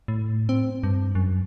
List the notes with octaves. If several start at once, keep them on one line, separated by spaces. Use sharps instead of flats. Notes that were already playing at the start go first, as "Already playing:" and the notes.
A2
C4
G2
F#2